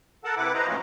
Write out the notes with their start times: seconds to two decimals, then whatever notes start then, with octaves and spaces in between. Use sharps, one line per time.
0.24 A4 A#4 F#5 A5
0.37 C3 E4 B4 F#5 D6
0.54 B4 C5 D#5 A#5
0.67 A2 F3 A#3 C#4 F4 F#4